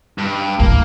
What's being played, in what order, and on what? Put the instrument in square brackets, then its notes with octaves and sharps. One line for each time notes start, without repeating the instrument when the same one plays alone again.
[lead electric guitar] G2
[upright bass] D2 A2 [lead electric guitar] A#3